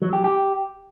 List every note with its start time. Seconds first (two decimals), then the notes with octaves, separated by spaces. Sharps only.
0.02 F#3
0.13 G4
0.24 G4